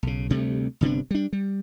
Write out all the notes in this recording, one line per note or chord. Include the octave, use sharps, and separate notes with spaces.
B1 C#3
D2 C3 G3 A3
G1 C3 B3 D4
G3 D4
G3